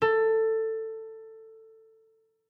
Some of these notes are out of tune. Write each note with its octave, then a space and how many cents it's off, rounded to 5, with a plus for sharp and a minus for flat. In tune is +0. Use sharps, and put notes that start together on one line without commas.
A4 +15